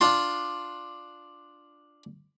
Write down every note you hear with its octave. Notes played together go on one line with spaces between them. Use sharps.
D4 F4 C6